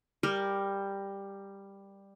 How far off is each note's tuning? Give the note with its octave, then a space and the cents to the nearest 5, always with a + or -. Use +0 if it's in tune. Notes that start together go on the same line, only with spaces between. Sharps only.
G3 +10 A#4 +0